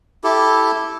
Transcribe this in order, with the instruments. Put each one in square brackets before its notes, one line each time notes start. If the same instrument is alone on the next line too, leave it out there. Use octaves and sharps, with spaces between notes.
[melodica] E4 G4 A4